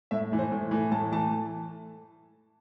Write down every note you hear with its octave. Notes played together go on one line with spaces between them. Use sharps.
A2 E5
E3 A3
C5
A2
E3 A3
A2 A5
E3 A3 A5